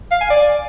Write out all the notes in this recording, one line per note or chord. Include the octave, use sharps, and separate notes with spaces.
F5
G#5
D5